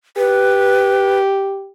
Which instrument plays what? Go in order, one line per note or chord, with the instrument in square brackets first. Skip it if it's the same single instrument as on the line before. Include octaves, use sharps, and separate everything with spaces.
[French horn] G4 [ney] B4